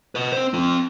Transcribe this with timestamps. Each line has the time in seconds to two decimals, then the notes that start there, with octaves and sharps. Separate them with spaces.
0.15 B4 D#5
0.32 C4 C5
0.54 C4 F4